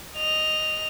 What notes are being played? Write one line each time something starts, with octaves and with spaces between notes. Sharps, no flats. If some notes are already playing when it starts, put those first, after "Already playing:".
D#5 F7